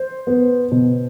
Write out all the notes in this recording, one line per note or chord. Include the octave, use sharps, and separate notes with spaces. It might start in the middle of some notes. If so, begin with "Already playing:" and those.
Already playing: C5
B3
B2